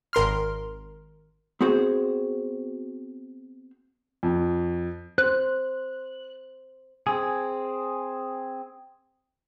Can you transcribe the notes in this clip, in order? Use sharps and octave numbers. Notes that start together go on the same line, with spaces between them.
G#1 A#4 C6 F6
B3 C4 F#4 G#4 C5
F2
C5 F#6
C4 G#4